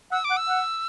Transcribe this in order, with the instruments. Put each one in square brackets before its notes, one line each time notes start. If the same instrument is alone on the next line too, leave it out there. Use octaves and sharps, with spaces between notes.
[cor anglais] F#5 [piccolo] E6
[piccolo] D6
[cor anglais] F#5
[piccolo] E6
[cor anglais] F#5